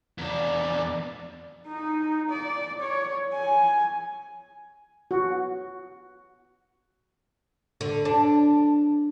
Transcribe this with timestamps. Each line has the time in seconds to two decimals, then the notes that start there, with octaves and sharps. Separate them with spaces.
0.18 E2 D4
1.67 D#4
2.29 D5
2.81 C#5
3.33 G#5
5.11 F#4
7.81 D3
8.05 D4